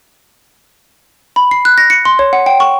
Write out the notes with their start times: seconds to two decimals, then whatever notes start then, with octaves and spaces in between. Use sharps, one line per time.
1.36 B5
1.51 C7
1.65 F#6
1.78 A#6
1.90 C#7
2.05 C6
2.19 C#5
2.33 F#5
2.46 G5
2.60 C#6